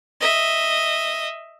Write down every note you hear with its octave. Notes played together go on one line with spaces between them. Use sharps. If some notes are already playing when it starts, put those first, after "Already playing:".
D#5 E5